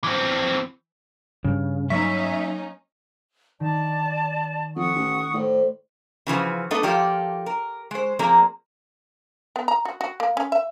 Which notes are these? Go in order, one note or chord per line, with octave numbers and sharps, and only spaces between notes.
E3 C4
G2 C#3
F#3 A#3 C#4 D#4 E5 C#6
D#3 D5 A5
F2 F#5 C#6 D#6
A1
A2 C5 D5
C#3 E3 F3 F#4
A3 B3 D4 A4 D#5
F3 A#3 F4 G4 A4 D5
A#4
G#3 C5
F3 A#3 C4 G#4 D5 A#5
B3
A#5
F#4
F#4
A#3
C#4
E5